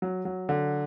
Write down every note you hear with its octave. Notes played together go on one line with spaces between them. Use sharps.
F#3
F#3
D3